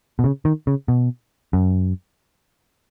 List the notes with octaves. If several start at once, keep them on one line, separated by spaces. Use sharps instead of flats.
B2
C#3
D#3
C#3
B2
F#2